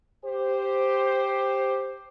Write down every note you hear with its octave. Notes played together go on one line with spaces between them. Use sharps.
G4 C5